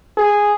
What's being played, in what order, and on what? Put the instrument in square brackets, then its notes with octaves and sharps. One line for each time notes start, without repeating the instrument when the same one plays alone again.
[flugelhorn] G#4